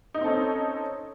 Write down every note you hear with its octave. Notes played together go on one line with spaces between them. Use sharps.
C4 C#4 D#4 A4 D#5